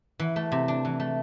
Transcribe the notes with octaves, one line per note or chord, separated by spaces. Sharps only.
E3
A3
C3
D4
E3
A3